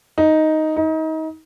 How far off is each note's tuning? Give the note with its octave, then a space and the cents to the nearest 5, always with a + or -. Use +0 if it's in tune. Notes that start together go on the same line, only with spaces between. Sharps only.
D#4 +5
D#4 +30